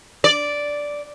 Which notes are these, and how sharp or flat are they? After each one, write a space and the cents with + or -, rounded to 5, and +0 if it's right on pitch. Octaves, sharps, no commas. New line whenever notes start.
D5 -5